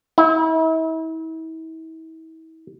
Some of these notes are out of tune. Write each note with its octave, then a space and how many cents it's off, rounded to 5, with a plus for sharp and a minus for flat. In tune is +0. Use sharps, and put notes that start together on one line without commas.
E4 -40